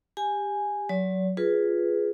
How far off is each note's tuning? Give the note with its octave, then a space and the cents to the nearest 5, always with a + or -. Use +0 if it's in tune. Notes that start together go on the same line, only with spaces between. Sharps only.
G4 +15 G#5 +0
F#3 +0 D5 -45
F4 +0 G#4 +0 B4 +0